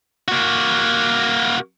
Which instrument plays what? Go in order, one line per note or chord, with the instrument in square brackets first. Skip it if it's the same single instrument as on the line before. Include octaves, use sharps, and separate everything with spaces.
[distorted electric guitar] A#3 F#4